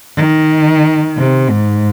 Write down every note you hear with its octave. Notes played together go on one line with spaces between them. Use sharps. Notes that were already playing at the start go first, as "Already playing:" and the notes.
D#3
C3
G#2